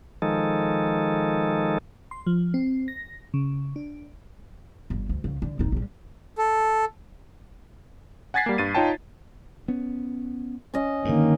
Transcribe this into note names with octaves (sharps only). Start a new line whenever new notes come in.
D#3 F3 G#3 D#4 A4
C6
F3
C4
A#6
C#3
D4
G1
D2
C#2
D3
D1 D#4
A#1 G3
A4
F#5 G#5 G#6 A6 B6 C7
G3 A#3
G2 A6 D#7
D#4 F4 C#5 G5 A5
B3 C#4
C#4 D#5
G2 D3 D#3 A#3